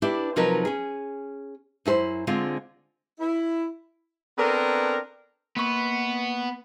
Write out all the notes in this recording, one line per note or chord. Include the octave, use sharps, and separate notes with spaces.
D4 E4 G4 B4
C3 F3 F#3 D#4 A#4 B4
C#4 G#4
F#2 E4 A4 C5
D3 G#3 C4 F4
E4
B3 C4 D4 A4 A#4
A#3 B3 C#6